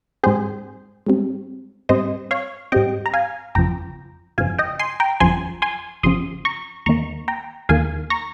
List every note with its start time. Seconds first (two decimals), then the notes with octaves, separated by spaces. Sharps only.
0.24 G#2 G3 C4 G#4 C5
1.06 G#2 G3 C4
1.89 G#2 G3 C4 C5 D#5
2.31 C#5 F5
2.72 G#2 G3 C4 D#5 G5
3.06 A#5
3.14 F5 G#5
3.55 G1 F2 C#3 F3 G5 A#5
4.38 G1 F2 C#3 F3 F5 G#5
4.59 D#5 G5
4.79 G#5 C6
5.00 G5 A#5
5.20 G1 F2 C#3 F3 G#5 C6
5.62 G#5 C6
6.03 G1 F2 C#3 F3 C6 D#6
6.45 A#5 C#6
6.86 D#2 D#3 A#3 A#5 C#6
7.28 G5 A#5
7.69 D#2 D#3 A#3 F5 G#5
8.10 A#5 C#6